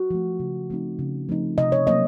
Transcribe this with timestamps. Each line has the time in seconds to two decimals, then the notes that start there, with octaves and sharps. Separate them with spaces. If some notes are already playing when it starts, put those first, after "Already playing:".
Already playing: F#4
0.11 F3 A3
0.40 C#3
0.70 F3 A3 C4 D#4
0.99 C#3
1.29 F3 A3 C4 D#4
1.58 C3 D#5
1.72 C#5
1.87 F#3 A#3 C#4 D#5